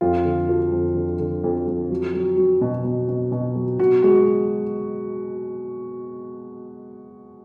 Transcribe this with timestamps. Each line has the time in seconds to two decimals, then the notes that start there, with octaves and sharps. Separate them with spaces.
0.01 F2 F4
0.25 D3
0.49 F3
0.72 F2
0.95 D3
1.19 D3
1.44 F2
1.67 F2
1.90 F#3
2.14 F#3
2.37 F#3
2.61 B2
2.85 B2
3.08 B2
3.32 B2
3.56 F#3
3.79 B2 F#4
4.03 G#3 F#4